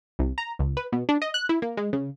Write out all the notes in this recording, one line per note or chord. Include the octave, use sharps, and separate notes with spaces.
C2
A#5
C#2
B4
B2
D4
D#5
F#6
E4
A#3
G#3
C#3